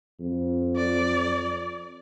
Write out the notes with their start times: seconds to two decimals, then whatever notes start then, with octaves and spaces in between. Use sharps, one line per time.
0.20 F2
0.77 D5